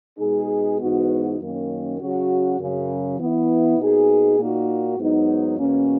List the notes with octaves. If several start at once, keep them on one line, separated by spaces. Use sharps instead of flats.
B2 G#3 D#4 G#4
G#2 E3 B3 D#4 F#4
F#2 D#3 A#3 C#4
C#3 F#3 C#4 F#4
F#2 C#3 F#3
E3 B3 E4
B2 A#3 D#4 G#4
A#2 A#3 D#4 F#4
G#2 F#3 B3 D#4 F#4
E2 B2 A#3 C#4